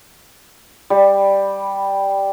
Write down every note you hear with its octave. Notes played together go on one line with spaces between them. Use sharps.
G3